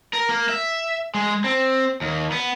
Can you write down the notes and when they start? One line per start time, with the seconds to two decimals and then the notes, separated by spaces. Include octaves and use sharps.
0.13 A#4
0.29 A#3
0.49 E5
1.15 G#3
1.44 C4
2.01 D#2
2.32 B3